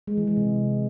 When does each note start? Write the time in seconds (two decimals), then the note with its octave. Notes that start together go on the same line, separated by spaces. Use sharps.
0.07 G#3
0.17 E3
0.27 G#3
0.37 C3